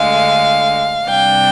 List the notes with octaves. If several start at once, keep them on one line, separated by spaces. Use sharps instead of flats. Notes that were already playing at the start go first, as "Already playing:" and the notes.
Already playing: D2 D3 G#3 F5
C3 G3 D4 G5